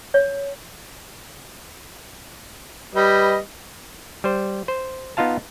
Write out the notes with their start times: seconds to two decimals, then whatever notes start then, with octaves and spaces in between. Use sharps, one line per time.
0.14 C#5
2.95 G3 B4 D#5
4.24 G3 C5
4.68 C5
5.17 B3 D#4 F4 F5 A5